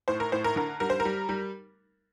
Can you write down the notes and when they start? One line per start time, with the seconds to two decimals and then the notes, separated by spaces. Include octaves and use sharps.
0.08 A2 C5
0.20 A#4
0.32 A2 C5
0.44 A#4
0.56 D3 A#4
0.80 G3 A#4
0.90 C5
1.00 A#4
1.05 G3
1.29 G3